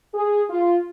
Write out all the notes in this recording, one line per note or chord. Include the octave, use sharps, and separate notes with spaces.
G#4
F4